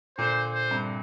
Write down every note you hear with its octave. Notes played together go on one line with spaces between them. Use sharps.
A#2 D3 C5
C5
G2 C3